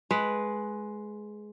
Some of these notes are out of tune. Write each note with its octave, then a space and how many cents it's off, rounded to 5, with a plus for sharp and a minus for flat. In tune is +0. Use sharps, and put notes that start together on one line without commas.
G#3 +15 B4 +0